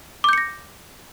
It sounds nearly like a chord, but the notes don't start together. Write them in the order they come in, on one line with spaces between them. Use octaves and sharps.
D6 G6 C#7 A#6